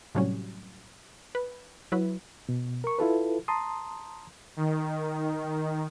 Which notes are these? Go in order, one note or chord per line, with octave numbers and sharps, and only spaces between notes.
A2 C3 F#3 G3 C#4
B4
F#3 E4 B4
B2
A#4 C#6
E4 F4 A4 B4
A5 A#5 C6 D#6
D#3